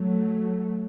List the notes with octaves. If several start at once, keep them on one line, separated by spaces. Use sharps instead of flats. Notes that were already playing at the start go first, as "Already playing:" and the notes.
Already playing: F#3 A3